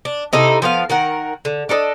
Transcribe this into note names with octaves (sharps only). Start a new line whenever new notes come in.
D4
C3 D#4 E4 A4
F3 B3 D4 F5
D#3 A#4 F#5
D3
D4 A4 A#4 D#5